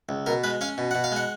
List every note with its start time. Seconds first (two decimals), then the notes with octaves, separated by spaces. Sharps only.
0.09 C#2
0.26 B2 A#4
0.44 G#3 B4
0.61 C#4 F5
0.78 B2
0.91 B2 F#5
1.04 F5
1.12 G#3 F#5